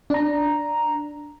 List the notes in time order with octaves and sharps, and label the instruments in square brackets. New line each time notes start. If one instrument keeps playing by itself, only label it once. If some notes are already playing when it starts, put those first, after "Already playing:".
[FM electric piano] D4 A#5